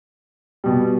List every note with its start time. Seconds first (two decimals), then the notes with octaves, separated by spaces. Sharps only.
0.64 B2 G3